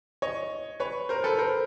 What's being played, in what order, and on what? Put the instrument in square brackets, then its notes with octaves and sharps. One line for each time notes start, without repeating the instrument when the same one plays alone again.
[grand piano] C#5 D#5
B4 C#5
A#4 C5
A4 B4
A#4 C5